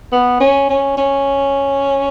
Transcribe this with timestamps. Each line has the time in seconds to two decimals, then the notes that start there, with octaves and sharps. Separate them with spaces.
0.12 B3
0.41 C#4
0.70 C#4
0.98 C#4